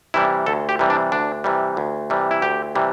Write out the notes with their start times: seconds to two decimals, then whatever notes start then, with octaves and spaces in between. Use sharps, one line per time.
0.14 C3 E3 G3 E4
0.46 D2 A4
0.69 G4
0.79 C3 E3 G3
0.90 D4
1.12 D2 D4
1.44 C3 E3 G3
1.77 D2
2.10 C3 E3 G3
2.31 E4
2.42 D2 G4
2.75 C3 E3 G3